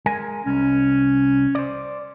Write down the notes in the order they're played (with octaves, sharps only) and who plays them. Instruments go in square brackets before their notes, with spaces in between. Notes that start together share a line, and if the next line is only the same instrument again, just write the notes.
[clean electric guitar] G#3 A#4 G#5
[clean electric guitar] C2 [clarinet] C#4
[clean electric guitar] C5 D5